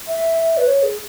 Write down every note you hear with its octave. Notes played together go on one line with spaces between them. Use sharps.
E5
B4
C#5
G#4